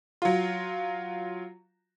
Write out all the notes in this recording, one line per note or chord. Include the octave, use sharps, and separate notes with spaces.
F#3 F4